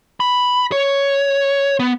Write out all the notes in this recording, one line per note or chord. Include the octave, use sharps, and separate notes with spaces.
B5
C#5
B3